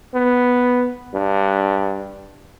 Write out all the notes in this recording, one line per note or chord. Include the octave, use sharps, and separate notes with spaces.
B3
G2